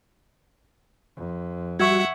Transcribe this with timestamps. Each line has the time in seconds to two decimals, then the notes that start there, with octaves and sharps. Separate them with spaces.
1.16 F2
1.80 G3 F#4 E5 F#5 C#6 E6 G#6